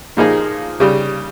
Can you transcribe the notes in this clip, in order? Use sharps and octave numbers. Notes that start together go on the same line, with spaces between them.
A#2 F3 A#3 D#4 G#4
C#3 G3